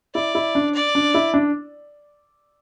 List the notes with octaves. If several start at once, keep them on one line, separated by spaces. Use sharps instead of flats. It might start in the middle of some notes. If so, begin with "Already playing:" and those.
E4 D5
E4
D4
D5
D4
E4
D4